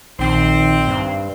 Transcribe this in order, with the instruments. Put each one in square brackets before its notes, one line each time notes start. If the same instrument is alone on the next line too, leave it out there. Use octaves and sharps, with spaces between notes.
[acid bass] A#1 [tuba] D#3 [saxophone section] C4
[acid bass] G2